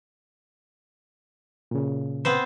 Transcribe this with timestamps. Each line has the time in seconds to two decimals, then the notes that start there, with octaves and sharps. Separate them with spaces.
1.71 A#2 C#3
2.25 B3 C4 C5